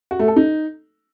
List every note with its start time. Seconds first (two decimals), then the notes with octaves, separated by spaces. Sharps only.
0.11 F#4
0.19 A3
0.28 A4
0.36 D#4